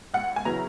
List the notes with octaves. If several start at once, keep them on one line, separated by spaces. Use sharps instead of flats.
C#2 F#5
G#5
C#3 F#3 B3 E4 A#5